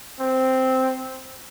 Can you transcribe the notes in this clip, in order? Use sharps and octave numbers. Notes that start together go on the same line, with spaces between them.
C4